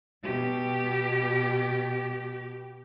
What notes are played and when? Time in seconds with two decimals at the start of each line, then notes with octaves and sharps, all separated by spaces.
0.24 B2 G4